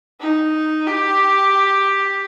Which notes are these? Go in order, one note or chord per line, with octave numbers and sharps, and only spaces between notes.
D#4
G4